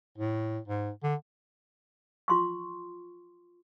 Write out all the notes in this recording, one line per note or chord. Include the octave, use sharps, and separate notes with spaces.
A2
G#2
D3
F4 C6 C#6